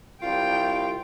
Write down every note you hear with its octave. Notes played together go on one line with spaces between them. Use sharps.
C2 F4 G5